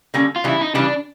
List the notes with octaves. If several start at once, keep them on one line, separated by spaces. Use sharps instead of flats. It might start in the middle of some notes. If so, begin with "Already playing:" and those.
D3 G3 A#3 C#4
F4
C#3 E3 G3 E4
D#4
C#3 E3 G3 D4